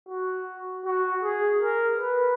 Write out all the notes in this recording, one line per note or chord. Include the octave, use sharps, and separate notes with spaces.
F#4
F#4
G#4
A#4
B4